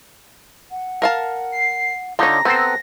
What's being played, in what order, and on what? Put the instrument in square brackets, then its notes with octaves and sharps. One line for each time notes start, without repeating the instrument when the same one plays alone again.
[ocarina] F#5
[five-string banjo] A#4 F5 A5
[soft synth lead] C7
[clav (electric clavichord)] D3 D#4 [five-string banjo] F4 C#5 [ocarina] A#5 [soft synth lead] A#6
[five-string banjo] B3 [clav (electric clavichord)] C4 A4 C5